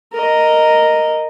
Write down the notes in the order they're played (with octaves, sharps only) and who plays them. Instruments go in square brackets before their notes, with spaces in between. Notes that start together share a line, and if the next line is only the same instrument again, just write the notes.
[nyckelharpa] A#4 D#5